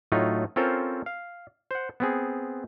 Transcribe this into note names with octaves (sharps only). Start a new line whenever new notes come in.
A2 F#3 A3 D#4 F4
C4 C#4 F4 A4 A#4 C5
F5
C5 F#5
B3 C4 G#4